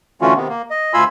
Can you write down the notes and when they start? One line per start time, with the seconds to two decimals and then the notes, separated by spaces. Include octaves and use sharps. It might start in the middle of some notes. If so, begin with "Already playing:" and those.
0.21 D3 E3 A3 C#4 F4 F#4
0.36 C3 D#3 B3
0.49 A#3
0.70 D#5
0.94 D2 F4 G#5 B5 C6 E6